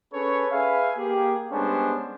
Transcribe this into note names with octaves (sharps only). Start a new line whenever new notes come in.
C#4 G#4 A4 B4 C#5
G#4 B4 E5 F5 G#5
A#3 G4 G#4
G3 G#3 B3 C#4 D4 C5